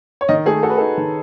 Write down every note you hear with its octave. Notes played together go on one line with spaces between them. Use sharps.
C#5
D#3 D#5
A3 G#4
F#4 A4
B4
D#4 A4
D#3